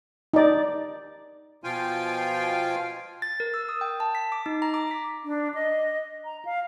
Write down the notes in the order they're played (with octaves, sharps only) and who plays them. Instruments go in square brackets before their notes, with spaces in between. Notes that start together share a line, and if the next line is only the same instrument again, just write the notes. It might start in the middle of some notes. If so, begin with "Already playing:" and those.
[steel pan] D#4 D5
[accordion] B2 F3 F4 F5 G5 G#5
[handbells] A6
A#4
E6
D#6
G5
A5
B6
D6
D#4
A#5
D6
B6
[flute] D4
D#5
A#5
F5